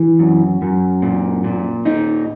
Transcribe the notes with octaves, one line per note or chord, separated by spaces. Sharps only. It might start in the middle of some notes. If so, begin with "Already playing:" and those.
Already playing: E3
F#2
F#2
A#2
A#2
D#4